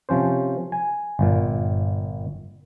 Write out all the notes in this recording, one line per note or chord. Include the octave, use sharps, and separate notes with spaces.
C3 F3 C#4 C5
G#5
G1 A#2